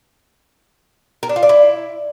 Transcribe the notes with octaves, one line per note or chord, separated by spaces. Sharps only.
A#4
D4
F4
D5
E4